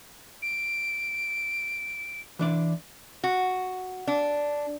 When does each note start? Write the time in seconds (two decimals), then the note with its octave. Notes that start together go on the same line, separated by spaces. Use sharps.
0.42 D7
2.39 E3 D4 D5
3.24 F#4
4.07 D4